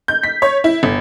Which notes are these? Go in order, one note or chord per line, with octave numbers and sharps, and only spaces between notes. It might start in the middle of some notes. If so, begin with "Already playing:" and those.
G6
B6
C#5
E4
G1